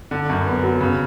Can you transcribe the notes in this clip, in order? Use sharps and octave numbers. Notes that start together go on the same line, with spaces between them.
D3
F#2
B3
F#3
C#3